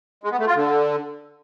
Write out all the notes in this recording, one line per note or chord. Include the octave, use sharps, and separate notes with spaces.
G#3
B3
A3
F4
D3